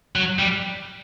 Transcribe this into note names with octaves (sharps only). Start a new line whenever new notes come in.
F#3
G3